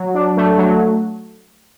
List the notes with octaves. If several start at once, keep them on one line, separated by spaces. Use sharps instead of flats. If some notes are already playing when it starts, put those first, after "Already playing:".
Already playing: F#3
D4
A3
F#3